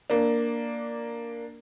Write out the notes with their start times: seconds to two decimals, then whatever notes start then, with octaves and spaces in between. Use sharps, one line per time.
0.10 A#3 D4